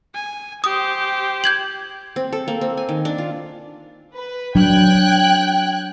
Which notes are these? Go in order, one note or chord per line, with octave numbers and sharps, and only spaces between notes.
G#5
G4 C5 D#6
G6 G#6 F#7
C4
A4
A#3
C4
G#5
D#3
D4
F4
B4
F#3 D4 G5 F#6 G#6